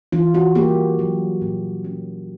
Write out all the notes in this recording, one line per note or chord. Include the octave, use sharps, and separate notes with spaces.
E3 F4
F#4
A#3 G4
F#3
A#2
C#4